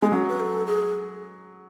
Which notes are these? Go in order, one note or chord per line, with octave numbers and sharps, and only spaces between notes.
G#3 B3
F#3 C#4
B4
A4
G#4